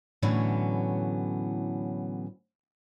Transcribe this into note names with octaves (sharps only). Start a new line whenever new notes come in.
A2 D3 E3 F#3 B3 C#4